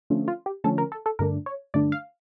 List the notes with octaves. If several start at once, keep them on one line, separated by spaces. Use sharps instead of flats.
D3 F3 A3 C#4
F4
G4
D3 F3 A3 C#4 A4
A#4
A4
A4
G2 D3 A3 D4 A#4
C#5
G2 D3 A3 D4 D5
F5